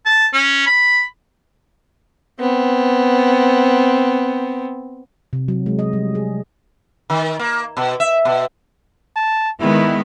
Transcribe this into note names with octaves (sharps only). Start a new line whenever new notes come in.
A5
C#4
B5
B3 C4
C3
F#3
G#3
D#5
G3
G#4
D#3
A#3
B2
E5
B2
A5
D#3 G#3 B3 E4